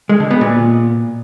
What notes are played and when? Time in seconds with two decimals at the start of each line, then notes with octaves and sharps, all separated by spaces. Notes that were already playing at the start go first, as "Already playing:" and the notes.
0.09 G#3
0.20 D3
0.31 B3
0.41 A#2